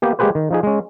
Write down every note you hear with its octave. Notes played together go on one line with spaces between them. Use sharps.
A#3 B3 G4
G#3 A#3 G4 G#4 B4 C5
D#3
F3 D#4 G#4
G#3 C#4